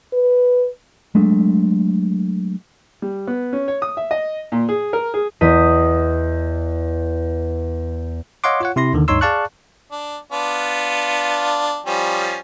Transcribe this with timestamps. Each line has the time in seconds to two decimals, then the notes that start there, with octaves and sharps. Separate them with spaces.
0.13 B4
1.15 F#3 G#3 A3 D4
3.02 G3
3.27 B3
3.53 C#4
3.68 C#5
3.82 D#6
3.97 E5
4.11 D#5
4.52 A#2
4.69 G#4
4.93 A#4
5.14 G#4
5.41 E2 D#5 B6 D#7
8.44 C#5 D#5 F5 F#5 C6 D6
8.61 F4 C#5 F#5
8.76 C3 E4 C6 A#6
8.93 D#2 D3 D#3
9.08 D2 G2 D#4 C#5 C6 E6
9.21 G#4 D5 F5 A5 C#6 F#6
9.91 D4
10.32 B3 D4 F4
11.86 F3 G3 C#4